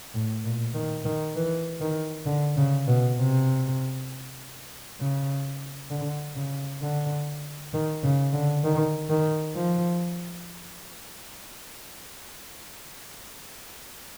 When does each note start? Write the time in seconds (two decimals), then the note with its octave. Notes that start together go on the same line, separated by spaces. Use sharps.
0.14 A2
0.44 A#2
0.74 D#3
1.04 D#3
1.36 E3
1.80 D#3
2.26 D3
2.57 C#3
2.87 B2
3.17 C3
5.00 C#3
5.90 D3
6.36 C#3
6.81 D3
7.73 D#3
8.03 C#3
8.33 D3
8.64 D#3
9.09 D#3
9.55 F3